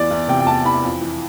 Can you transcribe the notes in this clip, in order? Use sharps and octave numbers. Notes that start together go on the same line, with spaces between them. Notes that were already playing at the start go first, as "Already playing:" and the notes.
Already playing: E2 E3 D5
E2
C3 G5
G5
E2 A5
E3 B5
F2
E3